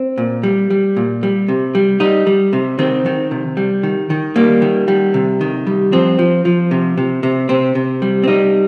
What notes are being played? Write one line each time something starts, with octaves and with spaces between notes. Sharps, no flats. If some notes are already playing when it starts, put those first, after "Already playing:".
Already playing: C4
A#2
G3
G3
A#2
G3
C3
G3
G3 D#4
G3
C3
D#3 C4
D#3
C3
G3
D#3
D#3
G3 A#3
D#3
G3
C3
D#3
G3
F3 C4
F3
F3
C3
C3
C3
C3 C4
C3
G3
C4
G3 D#4